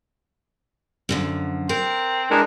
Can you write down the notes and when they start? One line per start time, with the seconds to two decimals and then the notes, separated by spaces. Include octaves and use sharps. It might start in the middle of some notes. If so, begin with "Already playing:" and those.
1.09 F#2 D3 F3
1.69 C4 A#4
2.31 E3 G#3 D4 A#4